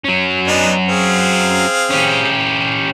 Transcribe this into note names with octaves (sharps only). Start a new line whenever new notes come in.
F#3 C#4
B3 D4 D#4
C4 G#4 F5
C#4 G4